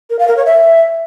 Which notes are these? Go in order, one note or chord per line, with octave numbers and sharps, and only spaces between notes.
A#4
F5
A#4
C#5
E5